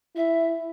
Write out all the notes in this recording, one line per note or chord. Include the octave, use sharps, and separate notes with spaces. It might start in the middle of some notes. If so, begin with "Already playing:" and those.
E4 E5